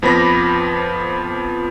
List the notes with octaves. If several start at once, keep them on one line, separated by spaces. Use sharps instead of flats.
F2 F3 B3 B5 D6 A#6